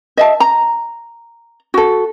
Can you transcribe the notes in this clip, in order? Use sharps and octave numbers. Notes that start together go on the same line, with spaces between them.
D#5 E5 A5
A#5
F#4 A4